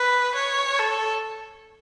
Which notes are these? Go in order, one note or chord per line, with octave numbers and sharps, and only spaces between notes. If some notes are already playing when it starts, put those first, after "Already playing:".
Already playing: B4
C#5
A4